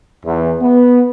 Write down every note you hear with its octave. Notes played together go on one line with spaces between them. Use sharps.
E2
B3